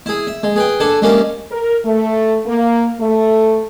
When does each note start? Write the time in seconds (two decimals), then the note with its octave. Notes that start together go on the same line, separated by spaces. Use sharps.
0.06 E4 G#4
0.27 E5
0.43 G#3
0.56 G#4 B4 G5
0.80 D4 A4 F#5 G#5
1.02 G3 G#3 A#3 C#4 A#4 E5
1.52 A#4
1.85 A3
2.46 A#3
3.00 A3